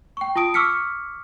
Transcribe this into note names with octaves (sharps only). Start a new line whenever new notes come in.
G5 C#6
F4 A5 D#6 D7
C#6 D6 E6 F6 B6 C#7